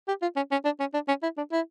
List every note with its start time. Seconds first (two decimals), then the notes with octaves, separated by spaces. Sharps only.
0.08 G4
0.22 F4
0.36 C#4
0.51 C#4
0.65 D4
0.80 C#4
0.94 D4
1.08 C#4
1.23 E4
1.37 D4
1.52 E4